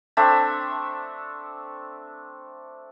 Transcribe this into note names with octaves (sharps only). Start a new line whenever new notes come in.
A3 C4 D4 E5